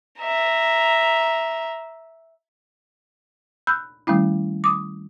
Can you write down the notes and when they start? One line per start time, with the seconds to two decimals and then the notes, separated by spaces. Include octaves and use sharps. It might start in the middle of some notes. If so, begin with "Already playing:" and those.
0.21 E5 A#5
3.67 B5 E6 F#6 G6
4.07 D#3 G3 A3 C#4 E4
4.64 D6 D#6